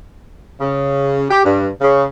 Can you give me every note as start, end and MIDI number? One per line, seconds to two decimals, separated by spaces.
0.60 1.23 49
1.30 1.43 67
1.45 1.68 43
1.81 2.05 49